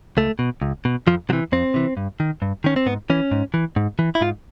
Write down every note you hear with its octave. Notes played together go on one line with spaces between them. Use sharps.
C#2 A3
B2
C#2
B2
F2 F3
C3 E3 F#3
F2 C4
C3 E3
G2
D#3
G2
D#3 C#4
C4
G#2 B3
E3 C#4
G#2
E3
G#2
E3
E4
G#2 F4